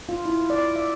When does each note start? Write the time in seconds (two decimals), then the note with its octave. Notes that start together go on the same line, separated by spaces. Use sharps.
0.09 F4
0.25 E4
0.50 D5
0.76 E5